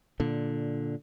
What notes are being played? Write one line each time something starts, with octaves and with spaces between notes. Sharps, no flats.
A#2 D3